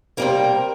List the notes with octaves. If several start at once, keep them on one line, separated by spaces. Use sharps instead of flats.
C3 G3 A#3 A#4